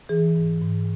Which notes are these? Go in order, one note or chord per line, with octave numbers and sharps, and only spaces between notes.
E3 G#4
G#2
G#2